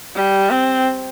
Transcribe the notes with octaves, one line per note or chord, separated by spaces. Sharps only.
G3
C4